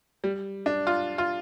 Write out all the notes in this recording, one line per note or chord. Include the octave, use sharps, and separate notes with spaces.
G3
D4
F4
F4